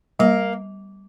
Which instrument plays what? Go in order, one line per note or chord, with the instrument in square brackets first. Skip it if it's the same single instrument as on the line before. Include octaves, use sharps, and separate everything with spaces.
[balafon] G3 [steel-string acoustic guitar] A#3